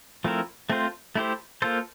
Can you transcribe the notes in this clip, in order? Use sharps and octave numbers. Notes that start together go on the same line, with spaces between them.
F3 A3 C4 E4 A#4
A3 C4 F4 C5
A3 E4 G4 C5
A#3 F4 A4 C5